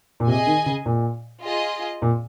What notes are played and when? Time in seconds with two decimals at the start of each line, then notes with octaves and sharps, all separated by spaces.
0.20 A#2
0.27 C3 G#4 D#5 G#5
0.47 D#3
0.66 C#3
0.86 A#2
1.43 F4 G#4 D#5
2.02 A#2